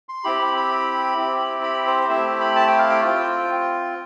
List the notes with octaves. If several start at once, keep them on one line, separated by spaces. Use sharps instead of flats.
C6
C4 E4 G4 B5
B5
B5
C4 E4 G4
B5
C5
A3 C4 E4 G4 E5
B5
A5
G5
F5
G5
C4 F4